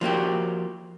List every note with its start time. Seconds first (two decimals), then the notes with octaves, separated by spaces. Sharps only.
0.01 F3 A#3 F#4 G4